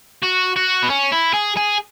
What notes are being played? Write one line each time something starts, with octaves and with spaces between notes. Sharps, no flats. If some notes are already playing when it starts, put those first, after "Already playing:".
F#4
F#4
B3
C#4
E4
G#4
G#4